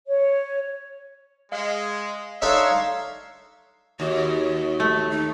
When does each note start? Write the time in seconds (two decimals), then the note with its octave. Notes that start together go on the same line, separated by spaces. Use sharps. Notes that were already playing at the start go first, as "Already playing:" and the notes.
0.08 C#5
1.52 G#3 F5
2.42 D4 D#4 A4 C#5 E5 F5 A#5 C6
4.00 D#2 F#4
4.80 A3
5.11 D#4